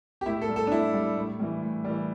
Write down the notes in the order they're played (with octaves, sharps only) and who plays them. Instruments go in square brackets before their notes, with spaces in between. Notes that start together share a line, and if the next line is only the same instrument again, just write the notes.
[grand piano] G4
A2 E4
A4
G3
A4
D4
A2 E4
G3
A2
E3 G3
A2
E3 G3